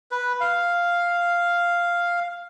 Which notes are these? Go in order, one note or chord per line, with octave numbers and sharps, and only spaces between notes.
B4
F5